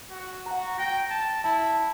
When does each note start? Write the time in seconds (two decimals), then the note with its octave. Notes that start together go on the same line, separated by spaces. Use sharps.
0.11 F#4
0.46 F#5 A#5
0.78 G5 A#6
1.10 A5
1.44 E4 A5